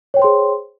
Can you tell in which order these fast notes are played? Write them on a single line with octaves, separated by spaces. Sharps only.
C#5 G5 C5 C6 G#4